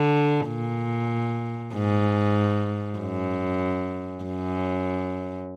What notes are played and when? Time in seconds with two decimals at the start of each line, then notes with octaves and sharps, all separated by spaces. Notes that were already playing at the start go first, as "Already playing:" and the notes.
Already playing: D3
0.47 A#2
1.73 G#2
2.98 F#2
4.24 F#2